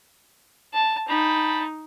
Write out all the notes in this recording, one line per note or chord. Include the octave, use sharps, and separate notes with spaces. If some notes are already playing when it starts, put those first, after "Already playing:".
A5
D#4 G5 A5 B5